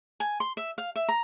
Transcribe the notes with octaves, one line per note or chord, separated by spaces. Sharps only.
G#5
C6
E5
F5
E5
A#5